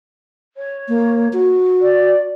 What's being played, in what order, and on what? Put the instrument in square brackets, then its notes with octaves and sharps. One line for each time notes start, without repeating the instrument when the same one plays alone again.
[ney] C#5
[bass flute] A#3
F#4
[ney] D5